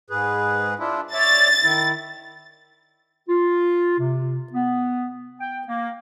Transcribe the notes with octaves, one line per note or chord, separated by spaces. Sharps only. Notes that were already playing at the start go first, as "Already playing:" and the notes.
G#2 G#4 B4
D4 E4 F4
C#5 D5 E5 A6
D#3 E4
F4
C3
B3
G5
A#3